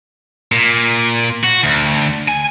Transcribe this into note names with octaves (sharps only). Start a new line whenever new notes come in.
A#2
F#4
D2
G#5